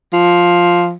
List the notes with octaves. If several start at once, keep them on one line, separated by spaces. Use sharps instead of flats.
F3